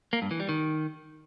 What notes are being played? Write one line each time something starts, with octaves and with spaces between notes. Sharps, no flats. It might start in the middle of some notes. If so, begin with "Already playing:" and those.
A#3
G2
E3
G3
D#3